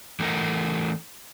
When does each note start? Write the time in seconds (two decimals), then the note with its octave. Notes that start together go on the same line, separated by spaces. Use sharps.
0.20 E3 A3 A#4 D#5 F#5